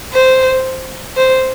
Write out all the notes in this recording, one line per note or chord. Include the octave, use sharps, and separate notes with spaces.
C5
C5